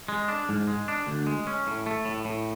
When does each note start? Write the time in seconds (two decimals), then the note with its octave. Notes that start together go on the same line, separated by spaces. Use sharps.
0.08 G#3
0.28 D4
0.49 G#2
0.67 G#3
0.88 D4
1.07 D2
1.27 G#3
1.47 C#4
1.67 A2
1.86 A3
2.05 A2
2.25 A2